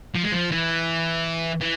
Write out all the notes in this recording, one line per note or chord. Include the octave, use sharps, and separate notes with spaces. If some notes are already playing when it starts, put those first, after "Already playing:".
F3
G#3
F3
E3
E3